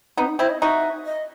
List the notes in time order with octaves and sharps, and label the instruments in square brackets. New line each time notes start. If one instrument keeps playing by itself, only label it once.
[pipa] B3 D#4 [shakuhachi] C4
[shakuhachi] D#4
[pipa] C4 E4 [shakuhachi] C5
[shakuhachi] D#5
[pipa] D#4 F#4 [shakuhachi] E5
[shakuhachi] D#5